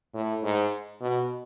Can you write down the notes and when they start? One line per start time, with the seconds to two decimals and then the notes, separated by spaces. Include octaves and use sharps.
0.14 A2
0.43 G#2
1.01 B2